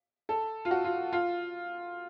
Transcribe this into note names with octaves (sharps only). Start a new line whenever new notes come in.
A4
F4
F#4
F4
F4